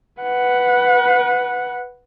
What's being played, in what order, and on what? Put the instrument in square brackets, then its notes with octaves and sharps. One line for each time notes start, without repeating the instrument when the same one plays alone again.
[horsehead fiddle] B4 F#5